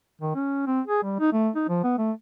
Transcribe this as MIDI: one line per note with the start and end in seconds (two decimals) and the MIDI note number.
0.21 0.33 51
0.35 0.65 61
0.67 0.81 60
0.87 1.03 68
1.03 1.17 55
1.19 1.32 63
1.32 1.49 57
1.55 1.65 63
1.69 1.79 53
1.83 1.97 59
1.98 2.12 57